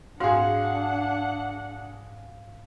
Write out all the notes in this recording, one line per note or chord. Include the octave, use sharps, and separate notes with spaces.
G#2 D4 F#4 G#4 F5 F#5